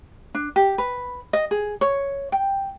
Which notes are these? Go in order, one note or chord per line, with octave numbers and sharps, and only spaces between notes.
D4
G4
B4
D#5
G#4
C#5
G5